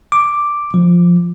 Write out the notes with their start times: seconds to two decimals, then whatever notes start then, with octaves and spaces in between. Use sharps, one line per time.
0.12 D6
0.74 F3